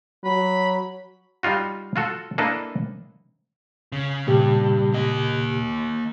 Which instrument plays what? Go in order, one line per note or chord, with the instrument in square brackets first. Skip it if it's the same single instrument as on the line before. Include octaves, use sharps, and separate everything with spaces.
[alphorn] F#3 [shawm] B5
[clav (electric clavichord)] G3 D#4 F4 F#4
F4 F#4 A4
A#3 D4 E4 A4 B4 D#5
[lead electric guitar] C#3
[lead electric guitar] G2 [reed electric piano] A#2 C#3 G4
[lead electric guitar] A#3 D#5